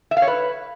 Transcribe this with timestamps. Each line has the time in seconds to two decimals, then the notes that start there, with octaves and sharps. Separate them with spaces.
0.11 E5
0.17 F5
0.22 C#5
0.28 B4